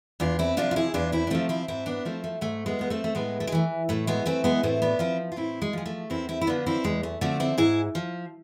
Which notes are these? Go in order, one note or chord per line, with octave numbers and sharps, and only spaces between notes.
E2 D4 F4
C4 E4
C3 F3 D4 F4
F4
E4 G#4
E2 D4 F4
C4 E4
D4
C3 F3 A3 C4
C4 E4
G#2 C4 E4
B3 D4
F3 A3 C4
A3
G#2 A3
G#3 B3
F3 B3
A3 C4
A3
A2 G#3 B3
A3
G#3
E3 A3
A2 A3
G#3 B3
E3 A3 C4
G#3 B3
A2 A3 C4
B3 D4
F3 C4 E4
F4
A2 C4 E4
G#3
F3 G#3
A3
E2 C4 E4
C4 E4
E4
D3 F3 B3 D4
C4 E4
E2 G#3
A3
D3 F3 A3 C4
C4 E4
G#2 E4 G#4
F3